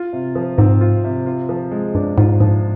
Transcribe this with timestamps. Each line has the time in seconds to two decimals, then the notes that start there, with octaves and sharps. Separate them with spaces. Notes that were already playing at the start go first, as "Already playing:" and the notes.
Already playing: F4
0.13 C3
0.35 F3
0.58 G#2 C4
0.81 F4
1.04 C3
1.26 F4
1.49 F3
1.71 G#3
1.95 G2 D4
2.18 G#2 F4
2.40 G#2 F3